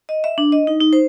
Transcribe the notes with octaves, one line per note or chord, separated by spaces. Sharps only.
D#5
E5
D4
D#5
D#4
D#4
C5